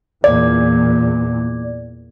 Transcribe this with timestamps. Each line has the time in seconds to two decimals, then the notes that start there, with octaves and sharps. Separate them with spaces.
0.24 E2 A#2 D5